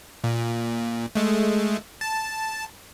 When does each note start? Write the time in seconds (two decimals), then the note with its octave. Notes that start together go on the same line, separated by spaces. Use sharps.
0.24 A#2
1.15 G#3 A3
2.01 A5